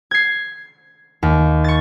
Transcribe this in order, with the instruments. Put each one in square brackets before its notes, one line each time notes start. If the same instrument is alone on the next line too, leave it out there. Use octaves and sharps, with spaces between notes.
[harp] G#6 C7
D#2
C#6 A6